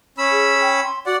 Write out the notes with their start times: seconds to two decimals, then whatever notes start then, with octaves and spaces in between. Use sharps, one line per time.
0.18 C#4 B5 E6
0.32 G#4
0.61 G5
0.84 C6
1.06 F#4 D5 F#5